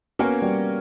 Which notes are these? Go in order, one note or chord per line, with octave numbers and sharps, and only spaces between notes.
A#3 B3 C#4 F#4 A#4 C#5
G3